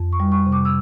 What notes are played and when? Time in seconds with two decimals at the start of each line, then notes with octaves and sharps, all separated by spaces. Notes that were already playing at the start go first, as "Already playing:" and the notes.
Already playing: F2
0.13 C#6
0.20 G3
0.32 C#6
0.46 C3
0.52 D6
0.65 E6